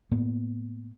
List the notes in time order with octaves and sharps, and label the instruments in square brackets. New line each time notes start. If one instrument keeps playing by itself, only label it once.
[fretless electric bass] A2 A#3 B3